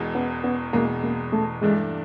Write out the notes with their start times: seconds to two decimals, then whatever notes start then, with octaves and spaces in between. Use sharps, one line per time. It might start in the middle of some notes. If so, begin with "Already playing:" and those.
Already playing: E1 E2 B2 G#3
0.15 B3
0.44 B3
0.73 E1 E2 B2 G#3 A#3
1.03 A#3
1.32 A3
1.61 G2 E3 G#3 A3 D4